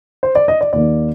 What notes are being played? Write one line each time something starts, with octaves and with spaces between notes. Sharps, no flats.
C5
D5
D#5
D5
D#2 D#3 A#3 D5